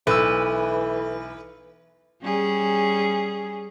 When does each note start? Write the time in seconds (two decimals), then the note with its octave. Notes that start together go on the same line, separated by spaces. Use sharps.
0.07 B1 E3 A4 B4 E6
2.22 G3 C#4 G#4